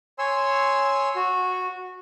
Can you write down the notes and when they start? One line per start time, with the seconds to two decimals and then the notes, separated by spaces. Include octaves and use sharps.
0.19 C#5 G#5 C6 E6
1.16 F#4